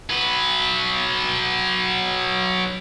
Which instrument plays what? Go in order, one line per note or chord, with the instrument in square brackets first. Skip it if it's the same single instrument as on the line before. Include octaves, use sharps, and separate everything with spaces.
[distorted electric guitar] F#3 B4